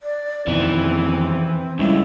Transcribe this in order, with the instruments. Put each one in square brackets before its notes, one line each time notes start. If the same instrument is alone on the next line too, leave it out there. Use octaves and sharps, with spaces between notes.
[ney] D5
[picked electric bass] F2 B2 D#3 [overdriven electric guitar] E3 [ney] C4
[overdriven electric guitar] C#2 [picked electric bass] C#3 G3 C#4 [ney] E4